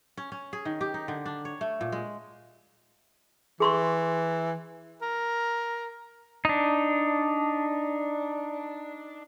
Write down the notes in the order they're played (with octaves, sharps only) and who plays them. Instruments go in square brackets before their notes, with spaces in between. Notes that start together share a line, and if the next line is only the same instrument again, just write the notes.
[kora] C#4
C#4
G#4
D#3
G4
D#4
D3
D4
C#5
A3
A#2
G#3
[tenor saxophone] E3 [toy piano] G#4 C6 C#6
[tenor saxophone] A#4
[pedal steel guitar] D4 D#4